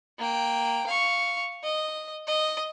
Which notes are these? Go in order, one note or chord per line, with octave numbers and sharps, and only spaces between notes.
A#3 G5
F5 C#6
D#5
D#5